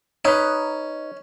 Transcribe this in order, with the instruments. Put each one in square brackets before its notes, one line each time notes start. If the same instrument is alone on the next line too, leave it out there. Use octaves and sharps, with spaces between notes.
[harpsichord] C#4 [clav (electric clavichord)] D#4 B4